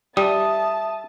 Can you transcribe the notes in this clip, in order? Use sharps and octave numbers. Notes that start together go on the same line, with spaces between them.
G3 E5 A5 D#6